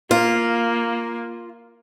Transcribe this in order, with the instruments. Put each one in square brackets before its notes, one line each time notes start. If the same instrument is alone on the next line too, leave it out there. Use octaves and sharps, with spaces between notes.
[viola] A#3 [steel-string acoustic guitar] F4